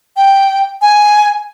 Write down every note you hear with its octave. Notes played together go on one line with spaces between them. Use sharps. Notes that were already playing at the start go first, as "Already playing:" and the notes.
G5
G#5